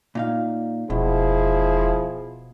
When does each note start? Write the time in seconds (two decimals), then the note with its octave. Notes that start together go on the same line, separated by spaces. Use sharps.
0.15 A#2 D#4 F5
0.90 E1 B2 F3 E4 G#4